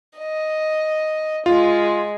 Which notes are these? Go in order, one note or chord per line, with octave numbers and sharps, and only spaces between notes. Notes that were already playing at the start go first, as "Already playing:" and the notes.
D#5
G#3 F4